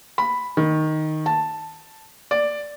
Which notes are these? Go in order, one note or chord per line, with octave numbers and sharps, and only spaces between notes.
B5
D#3
A5
D5